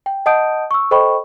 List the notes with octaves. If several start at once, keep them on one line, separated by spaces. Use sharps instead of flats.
G5
D#5 F#5 A5 D#6 G6 D7
C#6 E6
A4 C5 D#5 G5 B5 C#6